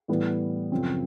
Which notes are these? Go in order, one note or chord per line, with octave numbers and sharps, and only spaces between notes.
A2 E3 G3 B3
F#2 C#3 F3 C4